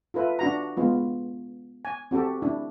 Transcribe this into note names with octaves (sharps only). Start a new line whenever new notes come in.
F4 A4 B4 E5
D4 F#4 A#5
G#3 B3 F4
G#5
C4 F#4 G4 A4
D4 E4